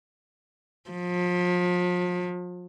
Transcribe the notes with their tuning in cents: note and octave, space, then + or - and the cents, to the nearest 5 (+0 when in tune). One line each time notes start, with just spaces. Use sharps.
F3 +35